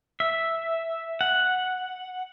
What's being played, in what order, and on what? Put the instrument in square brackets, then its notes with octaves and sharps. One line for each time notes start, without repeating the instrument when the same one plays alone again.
[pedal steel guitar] E5
F#5